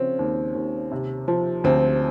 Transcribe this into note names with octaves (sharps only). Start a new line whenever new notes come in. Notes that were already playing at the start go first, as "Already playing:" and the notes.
Already playing: C#3 F3 C4 C#4
D#2
D#2
C3
F3
D2 C4